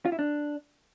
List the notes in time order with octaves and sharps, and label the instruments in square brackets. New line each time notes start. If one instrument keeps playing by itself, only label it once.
[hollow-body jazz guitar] F4
E4
D4